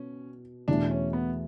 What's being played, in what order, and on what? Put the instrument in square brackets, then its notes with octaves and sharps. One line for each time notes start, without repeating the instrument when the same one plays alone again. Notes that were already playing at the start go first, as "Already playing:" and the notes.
Already playing: [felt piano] B2 [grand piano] C#4
[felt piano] E2 B2 A3 [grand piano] D4
[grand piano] C#4
B3